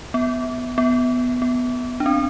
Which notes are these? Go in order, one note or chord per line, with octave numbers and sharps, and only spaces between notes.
B3
B3
B3
D4
C4